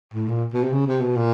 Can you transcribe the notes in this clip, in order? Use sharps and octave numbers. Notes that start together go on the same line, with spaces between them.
A2
A#2
B2
C3
C#3
C3
B2
A#2